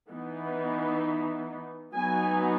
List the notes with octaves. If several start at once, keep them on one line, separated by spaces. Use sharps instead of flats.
E3 B3 D#4
F#3 B3 D#4 G#5